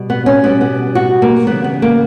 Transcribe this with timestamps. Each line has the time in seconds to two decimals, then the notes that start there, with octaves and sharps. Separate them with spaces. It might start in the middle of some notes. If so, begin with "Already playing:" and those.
Already playing: B2 G3
0.10 B3
0.26 C#4
0.43 B2 G3 B3
0.61 B3
0.95 F#4
1.22 A#3
1.47 C#3 E3 G3 B3
1.64 B3
1.82 A#3